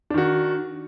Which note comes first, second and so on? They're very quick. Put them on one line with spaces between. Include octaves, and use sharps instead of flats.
D4 D#3 F#4